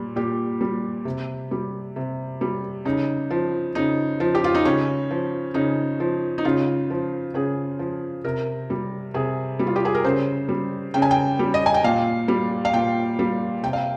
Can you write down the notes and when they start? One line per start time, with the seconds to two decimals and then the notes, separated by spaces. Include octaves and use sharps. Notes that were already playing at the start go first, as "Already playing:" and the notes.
Already playing: A#2 G3
0.16 A#2 G4
0.61 G3
1.05 C3
1.51 G3
1.96 C3
2.41 G3
2.85 C#3 D#4
3.30 F3
3.75 C#3 D#4
4.20 F3
4.35 G4
4.44 F4
4.55 D#4
4.65 C#3 C#4
5.11 F3
5.54 C#3 D#4
6.00 F3
6.38 D#4
6.45 C#3 F4
6.90 F3
7.34 C#3 G#4
7.79 F3
8.24 C3 A#4
8.70 G3
9.14 C3 G#4
9.59 G3
9.67 F4
9.76 G4
9.85 G#4
9.95 A#4
10.04 C#3 C5
10.49 G3
10.94 C#3 G5
11.02 G#5
11.11 G5
11.39 G3
11.54 D#5
11.66 G#5
11.74 G5
11.84 A#2 F5
12.28 G3
12.65 F5
12.74 A#2 G5
13.19 G3
13.63 C3 G5
13.73 F5